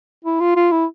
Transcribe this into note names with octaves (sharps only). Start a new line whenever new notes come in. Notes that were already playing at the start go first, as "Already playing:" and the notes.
E4
F4
F4
E4